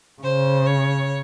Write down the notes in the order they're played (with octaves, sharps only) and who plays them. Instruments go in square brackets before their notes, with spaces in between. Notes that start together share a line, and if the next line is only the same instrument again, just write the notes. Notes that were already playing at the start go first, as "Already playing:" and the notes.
[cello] C#3 [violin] C5
[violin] C#5